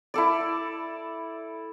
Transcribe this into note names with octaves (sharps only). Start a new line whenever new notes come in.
E4 A4 D5